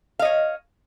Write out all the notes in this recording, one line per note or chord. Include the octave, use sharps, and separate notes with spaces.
C#5 D#5 F5